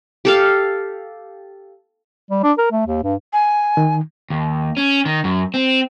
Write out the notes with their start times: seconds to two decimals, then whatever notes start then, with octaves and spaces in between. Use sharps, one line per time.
0.25 G4 A4 F5
2.31 G3
2.43 D4
2.58 A#4
2.72 A3
2.87 D#2
3.03 G2
3.33 G#5
3.77 D#3
4.30 D#2
4.77 C#4
5.06 D#3
5.24 F#2
5.54 C4